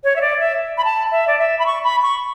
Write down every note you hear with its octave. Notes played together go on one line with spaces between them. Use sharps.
C#5
E5
D5
E5
B5
A5
E5
D5
E5
B5
C#6
B5
C#6